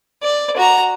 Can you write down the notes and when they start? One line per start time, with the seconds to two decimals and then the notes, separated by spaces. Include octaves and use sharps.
0.23 D5
0.57 F#4 A#5